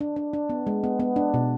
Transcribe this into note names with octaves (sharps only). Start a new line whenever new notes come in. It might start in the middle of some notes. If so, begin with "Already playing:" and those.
D4
D4
D4
B3
G#3
B3
B3
D4
B2